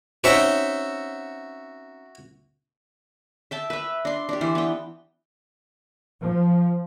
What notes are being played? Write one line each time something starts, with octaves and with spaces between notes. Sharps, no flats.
C4 C#4 D#4 F#4 E5
E5 G5 A5
B4 E5
D4 C6
D4 G4
E3 C5
B3 G5
F3